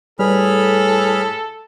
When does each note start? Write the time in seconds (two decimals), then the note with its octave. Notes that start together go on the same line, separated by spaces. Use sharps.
0.19 A2 G3 G#4 A4 B4 B5 F6